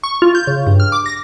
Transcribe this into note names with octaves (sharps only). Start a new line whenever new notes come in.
C#6
F4
G6
C#3
G2
F6
D6
A#6